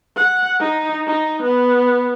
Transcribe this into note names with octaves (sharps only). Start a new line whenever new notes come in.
F#5
D#4
D#4
B3